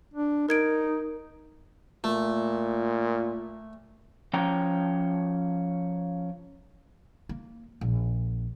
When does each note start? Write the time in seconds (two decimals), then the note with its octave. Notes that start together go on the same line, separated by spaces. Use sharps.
0.14 D4
0.49 D#4 A#4 G#6 D7
2.04 A#2 A3
4.33 F3 C#4 C#5 G5 A#5
7.29 A#3
7.81 A#1